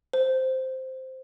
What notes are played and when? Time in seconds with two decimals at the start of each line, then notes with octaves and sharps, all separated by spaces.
0.13 C5